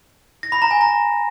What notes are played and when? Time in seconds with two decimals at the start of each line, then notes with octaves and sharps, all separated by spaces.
0.43 A#6
0.52 B5
0.62 A#5
0.71 G#5
0.81 A#5